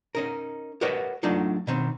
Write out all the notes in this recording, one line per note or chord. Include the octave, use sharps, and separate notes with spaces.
C#4 D#4 A#4
G4 A#4 B4 C#5 D#5 F#5
F#3 A3 D4 D#4 F4
B2 D#3 C4